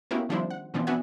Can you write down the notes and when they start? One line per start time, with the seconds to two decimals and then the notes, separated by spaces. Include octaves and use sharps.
0.11 A#3 B3 C#4 E4 F#4 G4
0.29 D#3 F3 G3 D4 E4 C5
0.50 F#5
0.74 B2 E3 F3 B3 C4 D4
0.87 B3 D4 F#4 E5 F#5 G#5